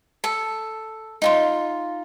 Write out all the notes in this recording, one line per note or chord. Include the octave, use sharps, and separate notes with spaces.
A4
D#4 F4 C6